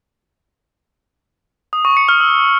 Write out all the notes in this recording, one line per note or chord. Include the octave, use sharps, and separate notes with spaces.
D#6
C#6
C#7
F6
E6